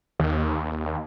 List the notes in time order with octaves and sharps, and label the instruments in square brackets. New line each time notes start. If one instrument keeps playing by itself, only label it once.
[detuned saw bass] D#2